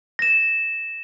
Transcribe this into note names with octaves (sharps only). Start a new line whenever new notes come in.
A#6 E7